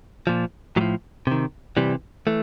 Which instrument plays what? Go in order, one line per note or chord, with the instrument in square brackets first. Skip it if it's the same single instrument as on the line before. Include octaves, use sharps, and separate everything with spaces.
[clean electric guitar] A#2 F3
A2 F#3
F3
C3 D#3
C3 E3 G3
E3 A3